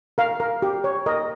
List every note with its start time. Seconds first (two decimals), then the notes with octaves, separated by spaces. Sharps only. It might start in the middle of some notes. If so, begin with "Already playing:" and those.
0.18 A#4 F5
0.40 A#4
0.62 G4
0.84 C#5
1.06 A#4 D#5